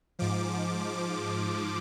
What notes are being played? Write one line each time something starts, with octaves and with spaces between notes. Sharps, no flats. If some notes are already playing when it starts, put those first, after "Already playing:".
G#2 F3 D6